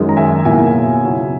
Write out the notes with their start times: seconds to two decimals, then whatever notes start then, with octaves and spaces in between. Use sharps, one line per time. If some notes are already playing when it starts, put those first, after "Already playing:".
Already playing: F#2 D#3 G#3
0.09 A#5
0.16 E5 G#5
0.45 B2 A#3 E4 E5 G#5
1.03 C#3 F#3 C#4 E4